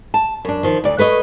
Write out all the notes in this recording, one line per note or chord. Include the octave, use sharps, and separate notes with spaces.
A5
F#2 D4
D#3 F3
D2 D5
A3 B4 C#5 D#5